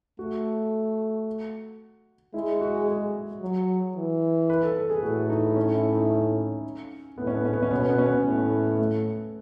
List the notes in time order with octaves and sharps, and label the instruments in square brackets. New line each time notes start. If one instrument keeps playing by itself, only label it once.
[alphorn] A3 [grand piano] F#4
[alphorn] G#3 [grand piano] E4
[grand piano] F#4
G#4
[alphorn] F#3
E3
[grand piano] B4
A4
A4
G#4
[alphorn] A2 [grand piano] F#4
[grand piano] D#4
C#4
E4
D#4
C#4
[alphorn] A2 [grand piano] B3
[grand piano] C#4
B3
C#4
B3
C#4
[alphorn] B2 [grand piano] B3
[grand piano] C#4
B3
C#4
B3
[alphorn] A2
[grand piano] A3